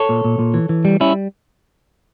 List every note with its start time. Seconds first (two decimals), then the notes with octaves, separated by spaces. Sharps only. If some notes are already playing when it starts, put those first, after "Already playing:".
Already playing: A4 C#5
0.09 A#2
0.24 A#2
0.39 A#2
0.54 E3
0.69 E3
0.85 G3
1.00 G3 C#4 E4